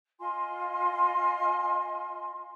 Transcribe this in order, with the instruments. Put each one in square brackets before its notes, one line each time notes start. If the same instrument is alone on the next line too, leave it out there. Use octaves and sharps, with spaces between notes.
[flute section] F4 D#5 G#5 C6